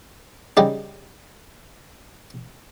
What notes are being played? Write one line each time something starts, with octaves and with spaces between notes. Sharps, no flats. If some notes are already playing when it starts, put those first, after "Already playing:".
C#3 G3 D#4 G4